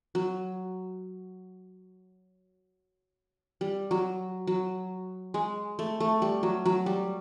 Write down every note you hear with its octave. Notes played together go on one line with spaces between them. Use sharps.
F#3
G3
F#3
F#3
G#3
A3
A3
G3
F#3
F#3
G3